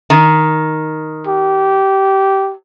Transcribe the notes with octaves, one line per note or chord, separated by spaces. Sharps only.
D#3
G4